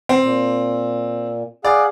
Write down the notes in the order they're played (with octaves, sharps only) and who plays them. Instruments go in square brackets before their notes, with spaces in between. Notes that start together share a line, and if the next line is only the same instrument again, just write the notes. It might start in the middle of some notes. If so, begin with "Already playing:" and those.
[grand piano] C4
[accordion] A#2
[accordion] G#4 F5 F#5 [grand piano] D5